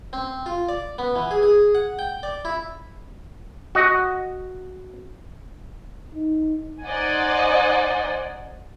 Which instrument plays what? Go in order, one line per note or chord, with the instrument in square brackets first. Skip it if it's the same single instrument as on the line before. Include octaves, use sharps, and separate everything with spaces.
[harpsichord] C4
F4
D5
B3
E3
G#4
G#4
F#5
G5
D5
E4
[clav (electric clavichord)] F#4 D#5
[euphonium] D#4
[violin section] D#4 C5 D5 D#5 F#5 G#5